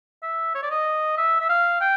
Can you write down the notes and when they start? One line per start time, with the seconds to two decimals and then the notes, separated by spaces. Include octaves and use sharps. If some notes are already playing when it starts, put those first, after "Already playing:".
0.23 E5
0.55 C#5
0.63 D5
0.70 D#5
1.18 E5
1.40 E5
1.49 F5
1.81 G5